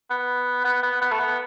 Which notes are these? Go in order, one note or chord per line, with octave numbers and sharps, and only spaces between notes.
B3
B3
B3
B3
A3
B3